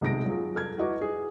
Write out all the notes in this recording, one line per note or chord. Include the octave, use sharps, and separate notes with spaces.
B1 C3 G#3 A#6 D7
F#3 F4 G#4
A4 F6 G#6
E4 F#4 B4 D#5 C#6 D6
G#4